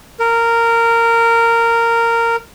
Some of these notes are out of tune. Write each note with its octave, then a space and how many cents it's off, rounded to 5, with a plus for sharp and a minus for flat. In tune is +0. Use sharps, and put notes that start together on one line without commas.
A#4 -15